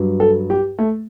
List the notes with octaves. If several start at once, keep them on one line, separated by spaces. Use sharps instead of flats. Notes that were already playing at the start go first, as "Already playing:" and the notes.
Already playing: G2 F#3
A4
G4
A3